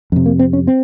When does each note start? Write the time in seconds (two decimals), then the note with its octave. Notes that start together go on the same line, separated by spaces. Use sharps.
0.12 F2 C3
0.26 A#3
0.39 C4
0.53 C#4
0.67 C4